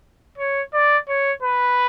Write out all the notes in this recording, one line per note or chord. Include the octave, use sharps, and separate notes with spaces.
C#5
D5
C#5
B4